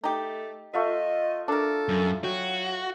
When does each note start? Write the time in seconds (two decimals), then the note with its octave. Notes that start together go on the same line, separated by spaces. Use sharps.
0.04 A3 D#4 G4
0.73 A3 F4 D#5 E5
1.48 D4 A4 A#4
1.89 F#2
2.24 F#3 F#4 G5